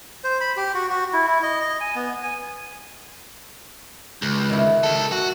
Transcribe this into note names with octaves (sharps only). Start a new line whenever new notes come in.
C5
B5
G4
F#4
F#4
E4
E4
D#5
D#5
G#5
B3
G#5
C#2
D#3 E4
C#2 A4
F#4